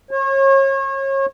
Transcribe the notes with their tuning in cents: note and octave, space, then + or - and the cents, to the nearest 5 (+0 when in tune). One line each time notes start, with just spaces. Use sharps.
C#5 -35